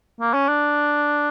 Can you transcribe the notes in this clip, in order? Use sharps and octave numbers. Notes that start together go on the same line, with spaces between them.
A#3
C#4
D4